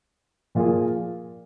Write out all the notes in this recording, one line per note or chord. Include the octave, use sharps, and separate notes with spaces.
A#2 F3 A#3 F4 G#4